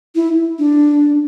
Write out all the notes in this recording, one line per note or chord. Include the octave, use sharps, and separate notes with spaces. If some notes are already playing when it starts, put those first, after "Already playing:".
E4
D4